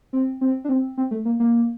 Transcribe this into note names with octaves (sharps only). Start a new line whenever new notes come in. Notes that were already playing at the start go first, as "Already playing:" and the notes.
C4
C4
D4
C4
C4
A3
A#3
A#3